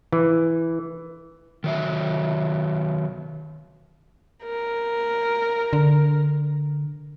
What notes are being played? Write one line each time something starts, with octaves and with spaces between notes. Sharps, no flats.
E3
D#3 F#3 E5
A#4
D3